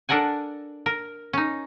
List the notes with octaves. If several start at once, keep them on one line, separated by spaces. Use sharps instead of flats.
D4 A4 A#4 F#5 G#5
A#4
C#4 D#4